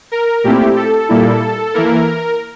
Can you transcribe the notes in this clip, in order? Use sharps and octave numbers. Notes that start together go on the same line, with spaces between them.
A#4
A#2 A3 C4 E4 G4
A4
A#2 G3 A#3 E4
E3 A#3 E4 A#4